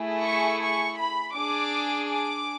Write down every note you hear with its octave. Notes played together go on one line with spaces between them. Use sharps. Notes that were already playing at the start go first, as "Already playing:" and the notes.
Already playing: A3 E4 G#4
C#6
C#6
B5
D4 G#4 D6
D6